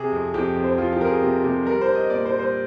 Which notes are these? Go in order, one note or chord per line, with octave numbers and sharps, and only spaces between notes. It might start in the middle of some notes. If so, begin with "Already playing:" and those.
Already playing: C3 G#4
F2
F2 G4
F2
C5
F2 F4
G4
F2 A#4
G#4
C3
C3
G3 A#4
C5
D4
D#5
A#2 D5
C5
G3
C5